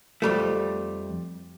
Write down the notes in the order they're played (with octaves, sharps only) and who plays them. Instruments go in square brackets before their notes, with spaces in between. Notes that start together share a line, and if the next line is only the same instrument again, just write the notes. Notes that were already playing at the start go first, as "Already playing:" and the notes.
[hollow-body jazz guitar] F2 G3 A3